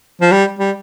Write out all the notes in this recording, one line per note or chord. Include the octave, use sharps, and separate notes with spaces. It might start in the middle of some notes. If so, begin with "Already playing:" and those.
F3
G3
G3